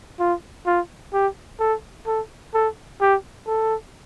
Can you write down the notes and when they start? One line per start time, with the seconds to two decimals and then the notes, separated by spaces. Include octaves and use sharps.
0.19 F4
0.66 F4
1.13 G4
1.60 A4
2.07 A4
2.54 A4
3.01 G4
3.47 A4